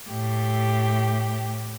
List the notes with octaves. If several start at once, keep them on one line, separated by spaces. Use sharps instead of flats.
A2 G4